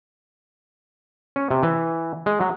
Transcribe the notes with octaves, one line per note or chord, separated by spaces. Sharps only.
C#4
C3
E3
G#3
F#3